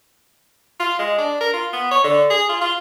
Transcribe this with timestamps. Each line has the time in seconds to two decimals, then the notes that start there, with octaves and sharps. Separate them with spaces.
0.80 F4
0.99 G#3
1.18 D4
1.40 A#4
1.53 F4
1.73 B3
1.91 C#5
2.04 D3
2.30 G#4
2.49 F4
2.61 F4